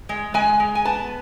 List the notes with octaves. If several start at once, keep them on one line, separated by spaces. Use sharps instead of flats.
G#3
G#3 G#5
G#3
G#5
B3 A5